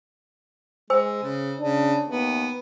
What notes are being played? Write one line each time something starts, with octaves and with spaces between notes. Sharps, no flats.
G#3 C5 G#5 E6
C#3
C#3 D4
D#2 B3